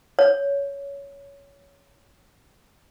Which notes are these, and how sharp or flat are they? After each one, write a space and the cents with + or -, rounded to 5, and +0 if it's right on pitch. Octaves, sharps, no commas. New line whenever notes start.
C#5 +15